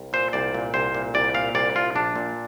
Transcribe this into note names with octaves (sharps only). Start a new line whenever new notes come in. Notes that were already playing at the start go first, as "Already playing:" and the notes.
Already playing: C2
A#2 C5
C2 D5
A#2
C2 C5
A#2
C2 D5
A#2 F5
C2 D5
A#2 F4
A#1 D4
A#2